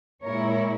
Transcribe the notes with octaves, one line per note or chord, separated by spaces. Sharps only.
A#2 G#3 E4 A#4 C#5